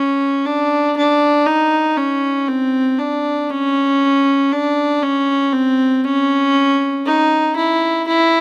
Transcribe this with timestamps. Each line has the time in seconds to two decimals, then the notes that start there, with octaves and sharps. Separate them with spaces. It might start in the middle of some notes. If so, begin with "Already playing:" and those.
Already playing: C#4
0.45 D4
0.97 D4
1.47 D#4
1.97 C#4
2.48 C4
2.99 D4
3.50 C#4
4.52 D4
5.03 C#4
5.53 C4
6.04 C#4
7.06 D#4
7.56 E4
8.08 E4